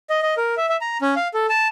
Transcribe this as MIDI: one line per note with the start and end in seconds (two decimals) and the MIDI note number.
0.10 0.20 75
0.23 0.34 75
0.37 0.55 70
0.57 0.66 76
0.69 0.77 76
0.81 0.98 82
1.02 1.14 61
1.16 1.28 77
1.34 1.46 69
1.49 1.68 81